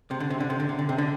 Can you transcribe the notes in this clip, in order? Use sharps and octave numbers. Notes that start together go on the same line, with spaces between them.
C3
D3
C3
D3
C3
D3
C3
D3
C3
D3